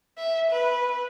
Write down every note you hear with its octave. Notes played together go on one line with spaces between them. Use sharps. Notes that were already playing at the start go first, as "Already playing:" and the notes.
E5
B4